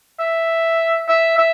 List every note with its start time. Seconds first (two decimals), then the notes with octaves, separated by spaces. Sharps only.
0.20 E5
1.08 E5
1.38 E5